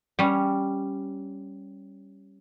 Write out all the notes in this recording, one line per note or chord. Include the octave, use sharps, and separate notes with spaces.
G3 C#4